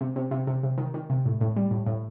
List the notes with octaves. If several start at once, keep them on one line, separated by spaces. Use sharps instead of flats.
C3
C3
C3
C3
C3
D#3
D#3
C3
A2
A2
G3
A2
A2